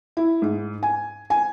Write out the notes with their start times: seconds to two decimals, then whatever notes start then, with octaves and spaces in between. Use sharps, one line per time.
0.17 E4
0.42 G#2
0.83 G#5
1.30 G#5